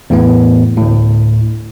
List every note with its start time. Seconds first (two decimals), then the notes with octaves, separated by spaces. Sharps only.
0.10 E2 A2 B3
0.78 D2 A2